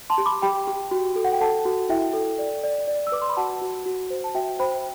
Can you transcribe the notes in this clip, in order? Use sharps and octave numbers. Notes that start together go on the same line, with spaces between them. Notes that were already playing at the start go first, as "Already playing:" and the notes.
A5 C6
G4
B5 D6
G4 G5 B5
G4
F#4
A4
F#5
G5
A4 F#5 A5
F#4
E4 E5 G5
A4
D5
D5
D5
E6
B4 D6
C6
B5
F#4 F#5 A5
F#4
F#4
C5
A5
F#4 E5 G5
C5 G5 B5